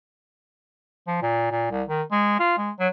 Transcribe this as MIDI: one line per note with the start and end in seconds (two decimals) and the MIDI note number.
1.07 1.18 53
1.22 1.50 46
1.51 1.69 46
1.71 1.83 36
1.88 2.02 51
2.12 2.37 56
2.40 2.55 65
2.58 2.71 56
2.79 2.88 54